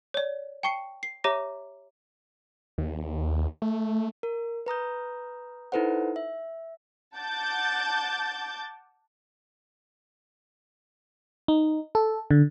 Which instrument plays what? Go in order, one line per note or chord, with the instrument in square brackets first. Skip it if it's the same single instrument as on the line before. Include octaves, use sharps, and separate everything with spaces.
[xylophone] C#5 D5
G5 A5 C#6 C7 C#7
C7
G4 C#5 E5 A#5 D6 A#6
[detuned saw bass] D#2
A3
[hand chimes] A#4
B4 A#5 D#6 G6
D#4 E4 A4 B4 C5 F#5
E5
[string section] F#5 A5 D6 G6 A6
[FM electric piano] D#4
A4
D3